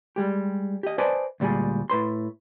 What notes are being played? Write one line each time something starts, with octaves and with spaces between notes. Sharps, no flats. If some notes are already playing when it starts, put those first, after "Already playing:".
G3 G#3 G4
G4 D#5
B4 C5 D5 D#5 G#5 A5
D2 A#2 G3 G#3 G#4
A2 B4 C6